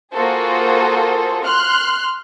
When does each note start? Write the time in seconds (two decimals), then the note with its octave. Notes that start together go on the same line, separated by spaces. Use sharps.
0.12 A#3 F4 F#4 G#4 A4 C5
1.44 C6 F6 F#6